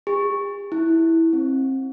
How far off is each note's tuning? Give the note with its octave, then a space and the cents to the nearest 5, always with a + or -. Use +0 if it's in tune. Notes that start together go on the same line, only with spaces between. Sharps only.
G4 +45
E4 -10
C4 +25